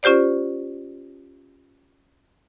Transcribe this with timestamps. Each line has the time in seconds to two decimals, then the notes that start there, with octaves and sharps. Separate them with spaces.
0.03 C#4 F4 G4 C5 D5